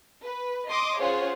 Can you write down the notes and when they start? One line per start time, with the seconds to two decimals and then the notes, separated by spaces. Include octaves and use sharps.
0.25 B4
0.71 D#5 C6 D6 D#6
1.01 C#4 F4 G#4 C5 C#5 F#5